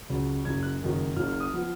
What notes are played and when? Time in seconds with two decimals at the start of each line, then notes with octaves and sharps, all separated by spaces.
0.10 C#2 C#3 F#3
0.45 F#1 F#2 C#3 G#6
0.63 F#6
0.81 F#1 F#2 D#3 G#3
1.16 F#1 F#2 C#3 F6
1.29 F6
1.40 D#6
1.53 F3 B3